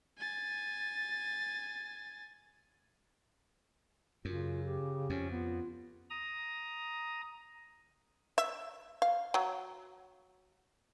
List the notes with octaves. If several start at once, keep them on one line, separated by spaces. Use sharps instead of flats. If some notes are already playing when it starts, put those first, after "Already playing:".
G#5 A6
F#2 C#3 F4
G4
F2 C#4
B3 F4
A#5 D#6
E5
F5
F#3